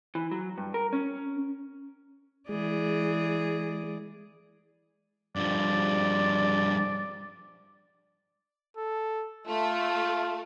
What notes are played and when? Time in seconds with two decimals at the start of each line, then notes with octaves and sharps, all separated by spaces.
0.15 E3
0.31 F#3
0.58 G2
0.74 A#4
0.93 C#4
2.49 E3 G#3 G#4 D5
5.36 G2 F3 D5
8.77 A4
9.48 A3 F4